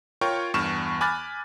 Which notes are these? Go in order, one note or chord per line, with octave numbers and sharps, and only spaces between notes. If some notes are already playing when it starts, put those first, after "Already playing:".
F4 A#4 C#5 G5 C#6
E2 G2 C#6 F6 E7
G#5 B5 D6 F6 F#6 A6